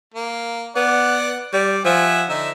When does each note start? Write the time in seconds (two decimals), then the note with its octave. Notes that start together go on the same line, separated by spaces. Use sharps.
0.14 A#3
0.76 B3 D5 F#5
1.53 G3 D5
1.85 F3 E5 F#5 G#5
2.29 D3 D#4 E5